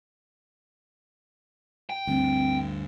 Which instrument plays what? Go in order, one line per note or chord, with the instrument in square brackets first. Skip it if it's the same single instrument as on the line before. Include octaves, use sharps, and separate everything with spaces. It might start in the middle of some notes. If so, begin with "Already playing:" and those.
[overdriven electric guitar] G5
[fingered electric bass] D2 G2 [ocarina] C4